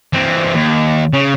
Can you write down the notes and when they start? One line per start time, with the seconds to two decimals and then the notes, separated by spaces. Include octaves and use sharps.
0.13 E3 C4
0.54 D#2
1.13 C#3